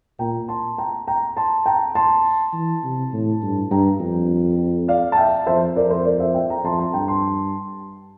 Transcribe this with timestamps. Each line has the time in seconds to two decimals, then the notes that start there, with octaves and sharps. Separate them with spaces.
0.19 A#2 G5 A#5
0.48 A5 C6
0.78 G5 A#5
1.08 G5 A#5
1.36 A5 C6
1.66 G5 A#5
1.95 A5 C6
2.53 E3
2.84 C3
3.13 A2
3.42 G2
3.71 G2 G5 A#5
4.00 F2
4.88 D5 F5
5.12 A5
5.17 E5 G5
5.46 F2 C5 E5
5.76 F2 A#4 D5
5.90 A4 C5
6.05 A#4 D5
6.20 C5 E5
6.34 E5 G5
6.50 G5 A#5
6.64 F2 A5 C6
6.79 A5 C6
6.93 G2 G5 A#5
7.08 A5 C6